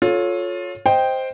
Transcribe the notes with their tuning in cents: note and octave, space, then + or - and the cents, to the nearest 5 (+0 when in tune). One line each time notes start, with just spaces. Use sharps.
F4 +20 A4 -10 C#5 +0
C5 +0 D#5 +0 G5 +0